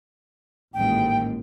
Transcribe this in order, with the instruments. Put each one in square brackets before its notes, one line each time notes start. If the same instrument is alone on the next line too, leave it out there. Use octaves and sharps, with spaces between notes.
[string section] A1 D#2 G#2 [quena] G5